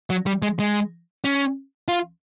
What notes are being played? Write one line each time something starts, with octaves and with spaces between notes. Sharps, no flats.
F#3
G3
G#3
G#3
C#4
F4